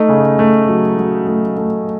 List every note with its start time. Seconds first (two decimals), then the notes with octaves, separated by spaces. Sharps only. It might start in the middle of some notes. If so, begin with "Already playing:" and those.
Already playing: A3 D#4
0.09 C#3
0.39 A3
0.69 F#3
0.98 F#3
1.27 A3
1.57 A3